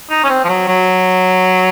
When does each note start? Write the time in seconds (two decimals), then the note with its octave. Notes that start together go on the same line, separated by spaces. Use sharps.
0.10 D#4
0.24 C#4
0.30 C4
0.44 F3
0.48 F#3
0.68 F#3